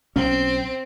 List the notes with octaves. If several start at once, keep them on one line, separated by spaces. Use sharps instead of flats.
B1 C4 C#4